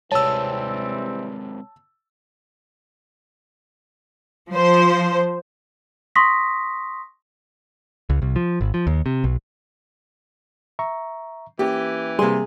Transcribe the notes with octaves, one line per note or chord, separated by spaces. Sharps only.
C3 E3 G3 G#3 C4 C#5 A5 E6
F3 C5
C6 C#6 D#6 A#6 B6
C#2
C2
F3
G#1
F3
D#2
C3
B1
E5 A#5 C#6
E3 A#3 C#4 G4
C3 G3 A#3 G#4 C6